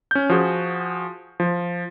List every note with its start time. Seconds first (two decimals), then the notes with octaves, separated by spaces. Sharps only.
0.11 C#4 G6
0.30 F3 F#4 G#4
1.40 F3